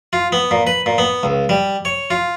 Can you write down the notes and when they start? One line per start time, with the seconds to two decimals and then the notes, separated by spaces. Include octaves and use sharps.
0.13 F4
0.32 B3
0.51 A#2
0.67 B4
0.86 A#2
0.98 B3
1.23 C#2
1.49 G3
1.85 C#5
2.10 F4